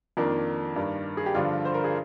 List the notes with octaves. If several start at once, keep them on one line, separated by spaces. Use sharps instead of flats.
F2 D#3 A#3 D4
G2 D#3
G#4
G4
G2 D3 F3 D4 F4
C5
A#4
G#4